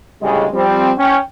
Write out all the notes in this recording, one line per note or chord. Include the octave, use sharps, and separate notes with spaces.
D2 A2 C#3 G3 G#3
F3 G3 C4
C#4 G5